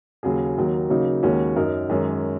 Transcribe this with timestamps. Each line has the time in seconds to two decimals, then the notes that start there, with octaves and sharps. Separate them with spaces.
0.23 D#2 C#3 F#3 C#4 G#4
0.57 D#2 D#3 F#3
0.90 C#3 F#3 A#3 D#4 F#4
1.23 D#2 D#3 G#3 C#4 F#4
1.56 F#2 F#3 D#4 A#4
1.89 F#2 D#3 G#3 C#4